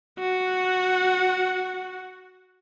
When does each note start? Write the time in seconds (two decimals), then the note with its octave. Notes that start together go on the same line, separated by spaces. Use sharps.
0.19 F#4 F#5